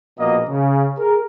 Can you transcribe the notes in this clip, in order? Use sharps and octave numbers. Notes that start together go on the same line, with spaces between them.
A#1 B2 A#3 D#5
C#3
G#4 A#4